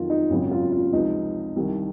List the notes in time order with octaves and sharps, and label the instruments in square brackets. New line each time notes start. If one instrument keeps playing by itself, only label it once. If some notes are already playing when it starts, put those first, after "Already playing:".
Already playing: [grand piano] F2 D#3 F#3 F4
D#4
G#1 F#2 C#3 F#3 F4
F4
F4
C#2 C3 F3 D#4
C2 C3 D#3